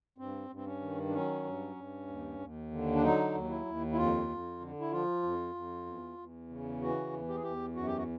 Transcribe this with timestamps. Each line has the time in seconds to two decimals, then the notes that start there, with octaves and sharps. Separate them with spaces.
0.18 G2 C4
0.49 G2
0.56 C4
0.66 C#4
0.81 D#3
1.09 D4
1.13 F#3 C#4
1.44 G2
1.76 G2
2.07 D#2
2.39 D#2
2.71 D3
2.95 D4
3.02 F#3 D#4
3.34 D#2
3.49 E4
3.65 D#2
3.92 E4
3.97 F2 F4
4.28 F2
4.60 D3
4.80 E4
4.91 F3 F4
5.23 F2
5.55 F2
5.86 E2
6.18 E2
6.49 C#3
6.81 E3 F#4
7.13 E2
7.29 G4
7.36 G#4
7.43 E2 G4
7.75 F#2 F#4
7.86 G4
7.97 F#4